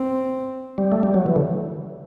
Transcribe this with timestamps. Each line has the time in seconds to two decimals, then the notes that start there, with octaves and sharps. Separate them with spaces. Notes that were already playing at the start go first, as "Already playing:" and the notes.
Already playing: C4
0.78 G3
0.92 A3
1.03 G3
1.14 F#3
1.26 E3
1.36 D3